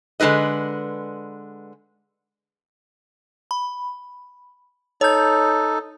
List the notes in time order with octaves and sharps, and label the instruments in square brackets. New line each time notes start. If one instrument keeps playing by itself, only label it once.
[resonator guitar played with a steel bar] D3 G#3 E4 B4 D#5
[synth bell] B5
[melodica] D#4 A4 [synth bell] C#5 G6